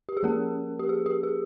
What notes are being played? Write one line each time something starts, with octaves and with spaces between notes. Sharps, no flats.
G4
G#4
F3 A#3 C#4 A#4
G4
G#4
G4
G#4